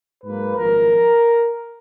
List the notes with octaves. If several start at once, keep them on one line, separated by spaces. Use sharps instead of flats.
G#2 F#3 A#3 B4
G#1 F#2 F3 A#4